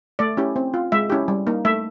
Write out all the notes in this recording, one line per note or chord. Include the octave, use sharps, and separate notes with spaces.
A3 D5
C#4 E4 G4
C4
F4
G#3 E5
C#4 E4 G4
G3
A#3 D#4
A3 E5